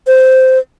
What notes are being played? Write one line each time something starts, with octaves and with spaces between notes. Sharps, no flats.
C5